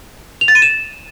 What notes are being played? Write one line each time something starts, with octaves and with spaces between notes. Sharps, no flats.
F7
A6
D#7
E7